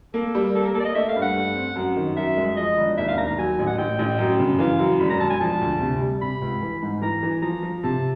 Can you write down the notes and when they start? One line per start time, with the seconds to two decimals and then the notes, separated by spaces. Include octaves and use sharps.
0.14 A#3 A4
0.35 G3
0.55 A#3 A4
0.65 A#4
0.74 A#3 A4
0.80 D5
0.85 D#5
0.95 A3 E5
1.09 F5
1.16 G2
1.22 F#5
1.35 A3
1.55 C4
1.76 F#2
1.96 D#3
2.17 F#2 E5
2.37 G#3
2.57 F3 D#5
2.77 E1
2.98 D#2 E5
3.08 F5
3.17 D#2 A#5
3.28 A#5
3.38 F#3 G#5
3.59 A1
3.67 F#5
3.78 A1 G5
3.99 A1
4.19 F#2
4.40 C#3
4.59 E3 F5
4.79 F#2
5.00 E1 B5
5.10 A#5
5.20 E1 A5
5.30 G#5
5.40 F3 A5
5.61 D2
5.81 C3
6.01 G3
6.21 C3 B5
6.41 C#2
6.61 E3
6.82 G#2
7.02 E3 A#5
7.23 E3
7.42 F3 A#5
7.62 F3
7.83 C3 A5